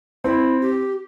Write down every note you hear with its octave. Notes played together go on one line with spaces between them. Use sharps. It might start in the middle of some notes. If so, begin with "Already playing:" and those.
C4 E4
G4